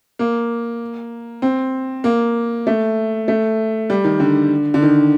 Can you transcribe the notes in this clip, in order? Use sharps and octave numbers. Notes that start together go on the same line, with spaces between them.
A#3
C4
A#3
A3
A3
G3
D#3
D3
D3
D#3